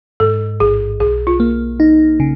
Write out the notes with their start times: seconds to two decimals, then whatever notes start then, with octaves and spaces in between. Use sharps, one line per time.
0.20 G#2 A4
0.60 A1 G#4
1.00 B1 G#4
1.27 F4
1.40 A#3
1.80 D#4
2.20 C#3